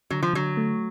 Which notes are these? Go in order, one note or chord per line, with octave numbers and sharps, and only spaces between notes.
D3 F#3
F3
D3 F#3
A3